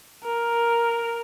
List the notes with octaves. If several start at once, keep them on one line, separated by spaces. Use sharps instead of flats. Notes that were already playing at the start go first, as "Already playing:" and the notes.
A#4